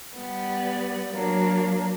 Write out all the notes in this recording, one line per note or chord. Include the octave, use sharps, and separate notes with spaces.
G3 B3
F#3 A#3 D4